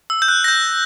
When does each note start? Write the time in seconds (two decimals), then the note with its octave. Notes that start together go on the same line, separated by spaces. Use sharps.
0.10 E6
0.22 G6
0.28 F#6
0.44 A#6
0.48 G6